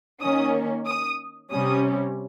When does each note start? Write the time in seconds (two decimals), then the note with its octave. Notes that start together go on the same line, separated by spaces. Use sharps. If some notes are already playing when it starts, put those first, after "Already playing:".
0.21 D#3 A#3 C#4 D#6
0.86 D#6
1.51 C3 G3 C#4 D#6